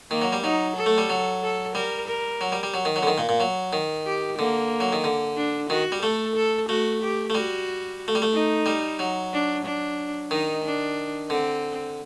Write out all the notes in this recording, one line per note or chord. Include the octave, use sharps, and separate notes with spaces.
D#3 A#3
F#3
G3
F#3 D#4
A4
A3
G3
F#3
A4
G3 A#4
A#4
F#3
G3
G3
F#3
D#3
F#3
D3
D#3
A#2
A#2
F#3
D#3
G4
D3 A#3
F#3
D#3
D3
D4
D#3 F#4
G3
A3 A4
A4
A3 F#4
G4
A3
G3 F#4
A3
G3
A3
D#4
G3
F#3
D4
D4
D#3 D#4
D4
D3 C4